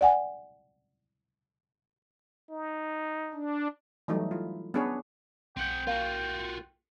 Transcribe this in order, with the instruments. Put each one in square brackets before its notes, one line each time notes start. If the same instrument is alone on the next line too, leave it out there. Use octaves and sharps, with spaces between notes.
[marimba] D5 F#5 G#5
[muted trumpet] D#4
[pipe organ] D4
[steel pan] E3 F#3 G3 A3 D#4
E4 F4
B3 C#4 D4 G#4 B4 C#5
[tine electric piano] B1 G6 [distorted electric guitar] C4 F#5 [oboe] G5
[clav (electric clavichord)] A#3 [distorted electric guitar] F4 F#4